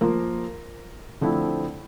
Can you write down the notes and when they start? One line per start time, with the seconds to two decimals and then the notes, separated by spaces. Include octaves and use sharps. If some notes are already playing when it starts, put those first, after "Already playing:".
0.01 F3 A#3 F4 A#4
1.21 D3 F3 A3 C4 E4